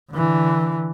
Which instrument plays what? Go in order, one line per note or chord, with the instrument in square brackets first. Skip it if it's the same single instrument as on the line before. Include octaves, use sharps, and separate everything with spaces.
[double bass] D3 E3